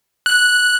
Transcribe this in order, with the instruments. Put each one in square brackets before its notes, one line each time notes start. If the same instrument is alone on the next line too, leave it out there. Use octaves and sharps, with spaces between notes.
[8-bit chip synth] F#6